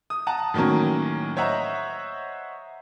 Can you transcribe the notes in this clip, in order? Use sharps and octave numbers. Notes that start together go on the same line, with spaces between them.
D#6
F#5 A5 A#5 D#6
A2 D#3 F#3 A#3 C#4
C5 C#5 D#5 E5 F#5 A#5